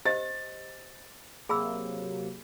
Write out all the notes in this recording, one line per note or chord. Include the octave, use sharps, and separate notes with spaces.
G4 C5 D#5 A6
C3 F#3 A#3 G#4 B5 E6